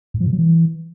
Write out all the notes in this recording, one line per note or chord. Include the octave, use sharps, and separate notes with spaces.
G#2
F3
C3
F#3
E3